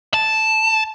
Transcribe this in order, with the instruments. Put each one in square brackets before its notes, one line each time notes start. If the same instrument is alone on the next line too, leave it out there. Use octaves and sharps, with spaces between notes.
[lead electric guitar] A5